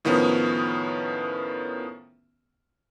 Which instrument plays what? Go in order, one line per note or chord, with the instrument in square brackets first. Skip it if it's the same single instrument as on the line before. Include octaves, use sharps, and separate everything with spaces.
[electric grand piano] A2 D#3 F3 B3 C#4